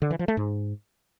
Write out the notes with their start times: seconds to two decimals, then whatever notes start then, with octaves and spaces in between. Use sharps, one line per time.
0.02 D3
0.11 E3
0.19 F3
0.28 A3
0.37 G#2